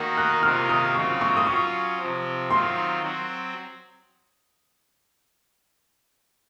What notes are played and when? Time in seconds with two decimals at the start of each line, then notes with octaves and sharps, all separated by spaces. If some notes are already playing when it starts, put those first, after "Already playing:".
Already playing: D#3 A#3 D#4 F#4
0.17 F#6
0.43 C3 D#3 A#3 F4 F6
0.69 D#6
0.95 C#3 F#3 C4 F4 C#6
1.21 C#6
1.37 D#6
1.47 F#3 C#4 F4 C#6
1.99 C3 F3 C4
2.50 D#3 F#3 C4 F4 C6
3.02 F#3 C4 F#4